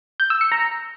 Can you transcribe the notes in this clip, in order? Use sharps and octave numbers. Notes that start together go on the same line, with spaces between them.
G6
E6
C#7
A#5